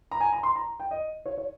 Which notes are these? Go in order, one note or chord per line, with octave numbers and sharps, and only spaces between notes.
A#5
G#5
A#5
C6
A#5
G5
D#5
C#5
C#5